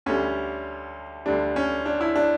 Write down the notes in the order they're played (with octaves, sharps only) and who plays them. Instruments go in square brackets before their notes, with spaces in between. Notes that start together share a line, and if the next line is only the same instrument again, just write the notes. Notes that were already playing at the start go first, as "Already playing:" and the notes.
[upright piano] D2 D3 G3 C#4
D2 D3 G3 D4
C#4
D4
E4
D4